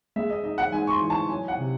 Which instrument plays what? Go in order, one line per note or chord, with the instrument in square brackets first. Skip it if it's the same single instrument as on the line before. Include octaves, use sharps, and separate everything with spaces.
[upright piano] G#3 E5
D#5
D#4 D#5
F#5
G#2 G#5
C#6
C6
E3
A5
F#3 G#5
F#5
C3